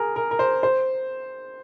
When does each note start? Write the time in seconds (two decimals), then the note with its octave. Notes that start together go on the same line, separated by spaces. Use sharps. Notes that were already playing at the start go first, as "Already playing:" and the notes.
Already playing: G#4 A#4
0.16 A#4
0.31 A#4
0.39 C5
0.63 C5